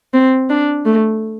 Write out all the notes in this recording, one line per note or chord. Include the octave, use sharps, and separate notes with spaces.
C4
D4
A3